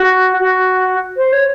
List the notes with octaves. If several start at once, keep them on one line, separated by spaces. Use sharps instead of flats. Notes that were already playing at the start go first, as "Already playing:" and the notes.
Already playing: F#4
F#4
C5
C#5